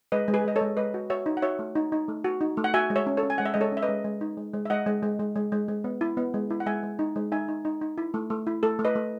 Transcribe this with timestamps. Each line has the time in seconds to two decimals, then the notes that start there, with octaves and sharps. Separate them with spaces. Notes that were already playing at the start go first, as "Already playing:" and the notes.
0.12 G#3 B4 D#5
0.28 G#3
0.34 G#4 B4
0.45 G#3 D#5
0.56 A4 C#5
0.61 G#3
0.77 G#3 B4 D#5
0.94 F#4
1.10 F#4 C#5 E5
1.26 D#4
1.37 F#5
1.42 F#4 C#5 E5
1.59 A3
1.75 D#4
1.92 D#4
2.08 A3
2.24 F#4
2.41 D#4
2.57 A3
2.64 F#5
2.74 F#4 E5 G#5
2.90 G#3
2.96 C#5 E5
3.07 C#4
3.17 A4 C#5
3.23 C#4
3.30 G#5
3.38 G#3 F#5
3.46 E5
3.54 G#3 D#5
3.61 A4 C#5
3.72 C#4 E5
3.83 B4 D#5
3.88 G#3
4.04 G#3
4.21 D#4
4.37 G#3
4.54 G#3
4.65 E5
4.70 G#3 D#5 F#5
4.86 G#3
5.03 G#3
5.20 G#3
5.36 G#3
5.52 G#3
5.68 G#3
5.84 B3
6.01 E4
6.17 B3
6.34 G#3
6.50 E4
6.60 F#5
6.66 G#3 E5 G#5
6.83 G#3
6.99 D#4
7.16 G#3
7.32 D#4 E5 G#5
7.48 D#4
7.65 D#4
7.81 D#4
7.98 E4
8.14 A3
8.30 A3
8.47 E4
8.63 A3 A4
8.79 A3
8.85 B4 D#5
8.96 A3